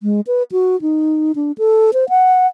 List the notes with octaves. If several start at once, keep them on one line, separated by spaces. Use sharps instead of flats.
G#3
B4
F#4
D#4
D4
A4
C5
F#5